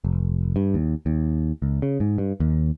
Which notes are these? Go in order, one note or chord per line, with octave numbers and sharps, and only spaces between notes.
F1
G2
D#2
D#2
C#2
C#3
G#2
G2
D#2